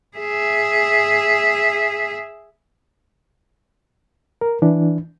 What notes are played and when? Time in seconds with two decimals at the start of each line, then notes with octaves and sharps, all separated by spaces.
0.18 G#4 E5
4.41 A#4
4.62 E3 D4